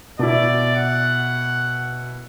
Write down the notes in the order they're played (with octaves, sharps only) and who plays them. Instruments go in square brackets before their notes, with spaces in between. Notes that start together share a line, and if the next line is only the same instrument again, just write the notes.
[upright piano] B2 E4 [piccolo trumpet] D5
[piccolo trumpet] F#5